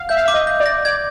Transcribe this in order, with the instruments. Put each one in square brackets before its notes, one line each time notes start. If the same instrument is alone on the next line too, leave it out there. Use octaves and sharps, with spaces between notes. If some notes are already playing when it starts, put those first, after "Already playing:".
Already playing: [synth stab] F5 F#5
[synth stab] E5 [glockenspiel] G6
[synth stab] F5
[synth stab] E5 [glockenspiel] D6
[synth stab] D#5
[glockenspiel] G6
[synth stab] D5
[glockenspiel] A#6
[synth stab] D5 [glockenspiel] G#6